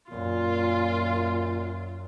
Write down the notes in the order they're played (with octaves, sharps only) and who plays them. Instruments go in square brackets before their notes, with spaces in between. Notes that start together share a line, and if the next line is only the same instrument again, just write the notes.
[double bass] F#2 [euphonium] A#2 [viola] F4